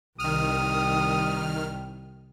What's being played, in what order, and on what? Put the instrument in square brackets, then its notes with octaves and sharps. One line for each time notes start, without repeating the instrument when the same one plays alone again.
[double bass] C2 G3 [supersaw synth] D#3 F6 [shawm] D#6